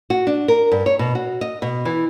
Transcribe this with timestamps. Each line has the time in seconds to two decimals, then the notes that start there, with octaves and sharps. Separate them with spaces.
0.10 F#4
0.27 D4
0.48 A#4
0.72 G2
0.86 C#5
0.99 B2
1.15 F#4
1.41 D#5
1.62 B2
1.85 E3